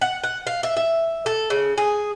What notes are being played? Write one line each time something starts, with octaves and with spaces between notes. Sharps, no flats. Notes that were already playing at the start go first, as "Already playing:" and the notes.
F#5
F#5
F5
E5
E5
A4
C#3
G#4